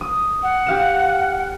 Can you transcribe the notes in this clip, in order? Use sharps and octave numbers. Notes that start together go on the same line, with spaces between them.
D#6
F#5
G4 F5 E7